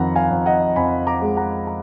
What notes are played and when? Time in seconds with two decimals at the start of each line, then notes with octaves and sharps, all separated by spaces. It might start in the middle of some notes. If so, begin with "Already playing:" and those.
Already playing: F2 D#3 F#5 A#5 B5
0.15 F5 G#5
0.31 F2
0.46 D#5 F#5
0.76 F2 G#5 B5
1.07 A#5 D6
1.22 G#3
1.37 F#5 A#5
1.67 A#5